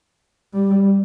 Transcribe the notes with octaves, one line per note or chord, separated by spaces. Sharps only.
G3